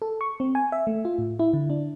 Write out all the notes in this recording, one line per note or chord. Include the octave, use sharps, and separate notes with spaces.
A4
C#6
C4
G#5
E5
A3
F4
A2
E4
D3
D4